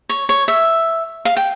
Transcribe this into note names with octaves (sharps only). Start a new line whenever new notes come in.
C#5
C#5
E5
F5
G5